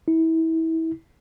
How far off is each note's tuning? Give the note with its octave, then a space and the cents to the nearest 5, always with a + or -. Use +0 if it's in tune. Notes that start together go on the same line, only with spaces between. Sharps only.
E4 -30